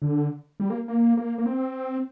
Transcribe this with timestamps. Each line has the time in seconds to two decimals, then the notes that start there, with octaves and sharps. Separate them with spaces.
0.02 D3
0.60 G3
0.70 A#3
0.88 A#3
1.17 A#3
1.38 A#3
1.46 C4